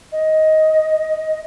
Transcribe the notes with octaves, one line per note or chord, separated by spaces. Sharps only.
D#5